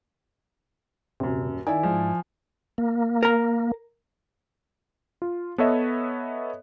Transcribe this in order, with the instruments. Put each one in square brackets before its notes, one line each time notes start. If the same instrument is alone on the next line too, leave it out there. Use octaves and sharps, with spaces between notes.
[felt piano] D#1 F#2 [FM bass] C3
[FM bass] D#3 [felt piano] E4 D5 [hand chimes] G#5
[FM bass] G#2 [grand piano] F3
[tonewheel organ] A#3
[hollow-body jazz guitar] A#4 A#5
[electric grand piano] F4
B3 A4 B4 C#5 D#5 E5